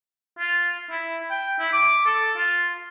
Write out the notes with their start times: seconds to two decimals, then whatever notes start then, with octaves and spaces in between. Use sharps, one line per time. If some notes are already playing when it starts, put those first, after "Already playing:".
0.39 F4
0.91 E4
1.31 G5
1.59 E4
1.73 D6
2.06 A4
2.37 F4